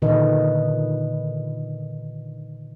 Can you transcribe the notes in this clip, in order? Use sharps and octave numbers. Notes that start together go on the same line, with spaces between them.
A#2 D3 D#3 B4 D#5